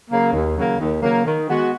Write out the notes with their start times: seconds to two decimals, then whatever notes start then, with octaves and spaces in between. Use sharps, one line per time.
0.11 C#3 F#3 A#3
0.33 D#2
0.56 C#3 F#3 A#3
0.79 D#2
1.02 C#3 F#3 A#3
1.26 D#3
1.48 G#3 B3 F#4